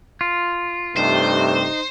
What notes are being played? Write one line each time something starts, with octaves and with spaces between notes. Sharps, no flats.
F4
G2 C3 A3 D#4 C5